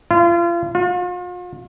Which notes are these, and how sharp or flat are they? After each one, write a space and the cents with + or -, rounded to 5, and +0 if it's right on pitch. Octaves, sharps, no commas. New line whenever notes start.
F4 -35
F4 +40